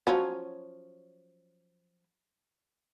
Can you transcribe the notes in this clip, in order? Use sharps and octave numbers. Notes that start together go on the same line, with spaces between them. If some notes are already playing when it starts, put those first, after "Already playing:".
F3 F#3 C#4